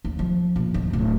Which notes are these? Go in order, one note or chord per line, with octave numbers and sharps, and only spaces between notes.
D#2
F3
A#1
D#2
D1